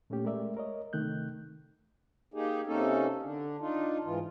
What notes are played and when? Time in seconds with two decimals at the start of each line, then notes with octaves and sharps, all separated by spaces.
0.10 A#2 A3 A#3 C#4 G4
0.25 G#3 A3 A#4 D5 E5
0.57 A#4 C#5 D#5
0.93 C3 D#3 A3 F#6 G6
2.34 A#3 D#4 G4 G#4
2.67 C3 A#3 C#4 D#4 A4
3.23 D3 D4
3.60 D4 D#4 F4
4.04 G#2 E3 F4